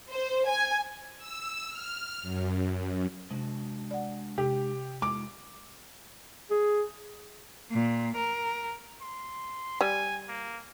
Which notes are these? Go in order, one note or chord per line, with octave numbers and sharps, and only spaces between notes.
C5
G#5
E6
F6
F#2
C3 G#3 D4 F#4
D5 F#5
C3 G4
G#3 D#4 F4 D6
G#4
A#2
A#4
C6
G3 G#5
A#3